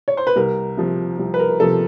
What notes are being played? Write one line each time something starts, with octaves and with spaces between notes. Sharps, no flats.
C#5
C5
B4
C2 A#4
C3 F3
C2
B4
A#4
C3 F3 A4